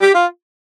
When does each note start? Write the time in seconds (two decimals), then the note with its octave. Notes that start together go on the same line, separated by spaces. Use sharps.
0.01 G4
0.14 F4